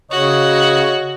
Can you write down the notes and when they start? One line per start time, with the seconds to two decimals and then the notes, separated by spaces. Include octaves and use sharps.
0.11 C#3 F#4 C#5 D#5